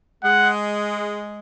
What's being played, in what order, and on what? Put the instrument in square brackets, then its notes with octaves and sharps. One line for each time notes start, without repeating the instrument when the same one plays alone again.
[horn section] G#3 [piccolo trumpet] F#5